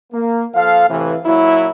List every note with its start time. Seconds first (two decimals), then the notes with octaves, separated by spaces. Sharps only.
0.12 A#3
0.54 F3 A4 F5
0.89 A2 C3 E3
1.25 A#2 F#3 E4